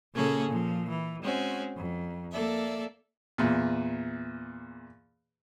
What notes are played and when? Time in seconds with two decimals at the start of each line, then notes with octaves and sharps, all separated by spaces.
0.14 A#2 C#3 A#3 C#4 G#4 A4
0.47 A#2 F3
0.89 E3
1.22 G#3 C4 C#4 F#4
1.77 F2
2.31 A#3 A4 D5 E5
3.38 E2 A#2